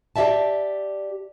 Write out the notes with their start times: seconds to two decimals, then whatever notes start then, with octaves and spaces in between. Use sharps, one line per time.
0.16 G4 D5 E5 A5